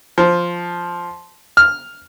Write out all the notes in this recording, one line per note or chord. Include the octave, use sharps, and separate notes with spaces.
F3
F6